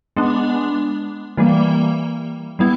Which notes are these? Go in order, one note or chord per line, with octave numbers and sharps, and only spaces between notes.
G#3 B3 D4
E3 G3 A#3
G3 B3 E4